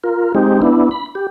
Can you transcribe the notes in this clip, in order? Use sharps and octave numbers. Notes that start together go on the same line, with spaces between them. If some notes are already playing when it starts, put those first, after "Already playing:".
F4 A#4
G#3 C4 D#4 G4
B3 D4 E4
B5
G4